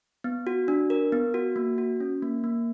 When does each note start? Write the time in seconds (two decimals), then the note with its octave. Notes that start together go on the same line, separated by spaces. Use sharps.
0.24 B3
0.47 F#4
0.68 D4
0.90 A#4
1.12 B3
1.34 F#4
1.56 A#3
1.78 F#4
2.00 C#4
2.22 A#3
2.44 A#3